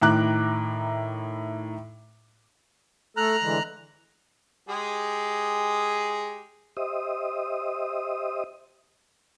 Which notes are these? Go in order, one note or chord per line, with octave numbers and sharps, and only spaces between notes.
A2 D#3 E4 A#5 D6 F#6
A3 A4 A#5 F6 F#6
D3 E3 G#3
G#3 G4 G#4
G4 C5 D#5 E5 D#6